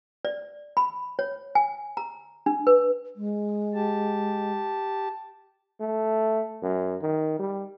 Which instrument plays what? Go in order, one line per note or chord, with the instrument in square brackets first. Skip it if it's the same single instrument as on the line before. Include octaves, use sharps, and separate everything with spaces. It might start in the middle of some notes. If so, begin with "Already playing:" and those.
[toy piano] D5
B5
C#5
G#5
A#5
D4
B4
[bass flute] G#3
[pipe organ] G4 A5
[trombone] A3
F#2
D#3
G3